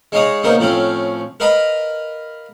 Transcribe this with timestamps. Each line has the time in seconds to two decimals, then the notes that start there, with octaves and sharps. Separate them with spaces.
0.12 G#3 D#4 C#5 F5 A#5 D#6
0.43 C#3 A#3 B3 D#4 C5
0.59 A2 F3 C4 C#4 F4
1.40 A#4 B4 D#5 F5 A#5 B5